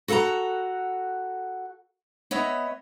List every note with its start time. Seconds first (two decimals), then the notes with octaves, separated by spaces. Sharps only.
0.08 F#4 A4 E5 F#5 A#5
2.31 B3 C#5 D#5 E5